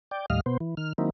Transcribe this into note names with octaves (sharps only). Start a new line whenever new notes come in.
D5 G5
D#2 A2 G3 D#5 F5 F6
B2 B3 C5
E3
D#3 F6
D#3 F#3 A#3 C4 D#4 E4